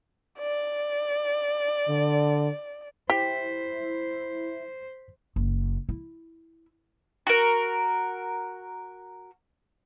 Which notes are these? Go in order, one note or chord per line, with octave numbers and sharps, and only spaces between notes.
D5
D3
E4 G4 C5 B6
F#1
E4
F#4 A#4